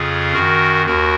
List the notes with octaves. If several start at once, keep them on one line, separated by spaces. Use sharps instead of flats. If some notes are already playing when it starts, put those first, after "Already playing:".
Already playing: F2 C#3 F4 G#4
F#2 D#3 F#4 A#4
D#2 F#4 A#4